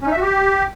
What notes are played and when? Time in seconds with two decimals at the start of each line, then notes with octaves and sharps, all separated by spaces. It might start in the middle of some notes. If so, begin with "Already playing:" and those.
0.01 C#4
0.07 D#4
0.12 E5
0.17 F#4
0.22 G4